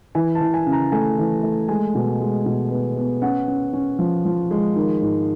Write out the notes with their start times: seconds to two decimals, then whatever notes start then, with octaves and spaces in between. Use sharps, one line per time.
0.15 E3 G#5
0.35 A5
0.41 E3
0.54 G#5
0.66 C#3
0.72 A#5
0.92 A3 G#5
1.18 E3
1.43 A3
1.68 G#3 G#5
1.95 B2
2.20 G#3
2.46 B2
2.71 B3
2.97 B3
3.22 C#4 F#5
3.48 C#4
3.73 C#4
3.99 F3
4.25 F3
4.51 G#3
4.76 D#3
5.02 G#2